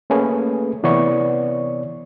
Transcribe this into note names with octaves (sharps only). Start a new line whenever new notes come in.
A3 A#3 C#4 G#4 B4
C3 E3 B3 C#5 D5 C#6